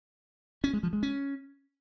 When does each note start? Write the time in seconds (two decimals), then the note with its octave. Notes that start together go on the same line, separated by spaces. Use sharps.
0.64 C#4
0.73 G#3
0.83 F3
0.93 G#3
1.03 C#4